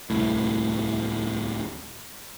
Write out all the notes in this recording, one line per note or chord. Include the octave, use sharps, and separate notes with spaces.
D1 C2 A2